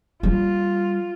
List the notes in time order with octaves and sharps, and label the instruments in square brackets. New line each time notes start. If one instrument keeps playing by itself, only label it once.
[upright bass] G3 A#3 [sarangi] F4